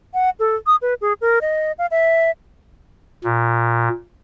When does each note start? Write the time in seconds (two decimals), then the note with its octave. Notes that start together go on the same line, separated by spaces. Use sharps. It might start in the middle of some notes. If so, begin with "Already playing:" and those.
0.14 F#5
0.39 A4
0.67 D#6
0.82 B4
1.01 G#4
1.21 A#4
1.41 D#5
1.78 F5
1.91 E5
3.24 A#2